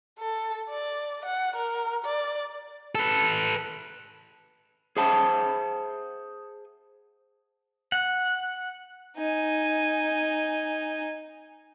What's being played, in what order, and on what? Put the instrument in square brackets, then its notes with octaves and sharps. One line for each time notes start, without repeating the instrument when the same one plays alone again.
[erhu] A4
D5
F#5
A#4
D5
[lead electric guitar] A4 B4
[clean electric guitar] G#4 C5 E5 F#5 A5
[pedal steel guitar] F#5
[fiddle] D#4 G#5